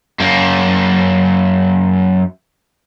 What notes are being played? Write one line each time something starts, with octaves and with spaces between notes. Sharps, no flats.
F#2 A#3